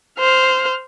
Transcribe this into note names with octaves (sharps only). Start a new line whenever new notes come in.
C5 F6